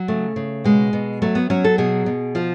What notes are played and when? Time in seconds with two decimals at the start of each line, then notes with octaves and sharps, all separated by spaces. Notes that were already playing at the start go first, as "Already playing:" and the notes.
Already playing: F#3
0.08 C#3 A3
0.36 C#3
0.64 B2 G#3
0.93 B2
1.22 F#3 A3
1.35 B3
1.50 F#3 C#4
1.64 A4
1.78 B2 G#4
2.06 B2
2.35 F3 F4